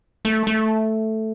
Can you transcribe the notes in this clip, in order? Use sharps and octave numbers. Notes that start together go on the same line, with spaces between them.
A3
A3